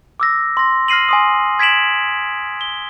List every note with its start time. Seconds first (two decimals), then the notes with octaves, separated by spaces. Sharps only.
0.20 D6 E6 A#6
0.57 C6 A#6
0.88 F6 A#6 C7 D#7 F#7
1.09 G#5 C6 D#6
1.59 G#6 B6 D7 E7 F#7
2.61 G7